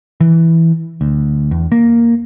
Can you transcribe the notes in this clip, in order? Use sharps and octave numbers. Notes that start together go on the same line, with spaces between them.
E3
D2
E2
A#3